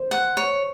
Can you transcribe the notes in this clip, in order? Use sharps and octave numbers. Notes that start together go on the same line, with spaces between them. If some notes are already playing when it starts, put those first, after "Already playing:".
Already playing: C5
F#5
C#5